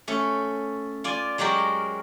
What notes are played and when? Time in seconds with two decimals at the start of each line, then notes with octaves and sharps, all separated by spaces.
0.08 A3 C#4 A4
1.04 F4 D5 G#5
1.38 F#3 G#3 F#4 G4 A#4